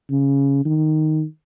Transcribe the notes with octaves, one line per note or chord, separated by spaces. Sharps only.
C#3
D#3